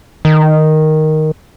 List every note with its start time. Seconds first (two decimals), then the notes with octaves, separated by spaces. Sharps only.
0.25 D#3